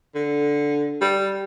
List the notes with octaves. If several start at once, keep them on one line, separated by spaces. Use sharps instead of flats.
D3
G3